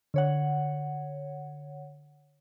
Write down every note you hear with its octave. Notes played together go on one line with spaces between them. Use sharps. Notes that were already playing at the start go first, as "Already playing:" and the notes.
D3 C#5 F#5